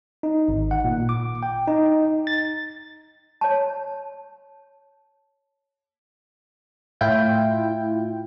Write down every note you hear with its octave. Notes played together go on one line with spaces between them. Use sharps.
D#4
G#1
F#5
A#2
D6
G5
D#4
A6
C#5 A5
A2 E4 F4 G5